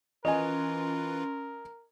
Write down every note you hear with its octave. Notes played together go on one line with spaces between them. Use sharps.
E3 C#4 F4 A#4 B4 D#5 G#5 C6